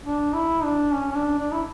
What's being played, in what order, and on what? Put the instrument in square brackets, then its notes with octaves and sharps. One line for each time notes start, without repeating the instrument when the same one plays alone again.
[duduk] D4
E4
D4
C#4
C#4
D4
D4
E4